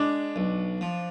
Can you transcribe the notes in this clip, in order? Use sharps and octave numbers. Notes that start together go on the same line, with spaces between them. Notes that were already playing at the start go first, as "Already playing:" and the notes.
Already playing: G#3 D4
B1
F3